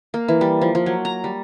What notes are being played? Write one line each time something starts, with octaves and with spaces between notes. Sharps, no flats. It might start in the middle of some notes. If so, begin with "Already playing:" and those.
A#3
E3
G3
F3
F3
F#3
A#5
G3